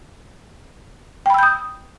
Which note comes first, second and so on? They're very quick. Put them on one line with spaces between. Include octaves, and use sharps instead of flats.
G5 B5 E6 G6 D#6